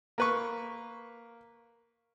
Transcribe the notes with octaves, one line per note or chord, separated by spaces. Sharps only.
A#3 B4 C#6